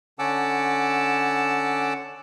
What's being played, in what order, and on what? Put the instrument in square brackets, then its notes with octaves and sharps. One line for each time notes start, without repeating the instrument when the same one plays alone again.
[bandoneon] D3 C#4 F#5 A5 D6 E6